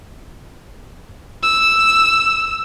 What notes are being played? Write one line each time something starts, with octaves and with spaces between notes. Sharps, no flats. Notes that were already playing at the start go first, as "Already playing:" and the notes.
E6